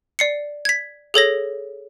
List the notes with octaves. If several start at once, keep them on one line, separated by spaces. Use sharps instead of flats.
D5 C7 C#7
G#6 B6
G#4 A4 C#5 A#6